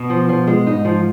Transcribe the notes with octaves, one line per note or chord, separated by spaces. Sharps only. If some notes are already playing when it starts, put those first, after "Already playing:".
Already playing: B2
F3
F3
G#3
G#2 D#4
F3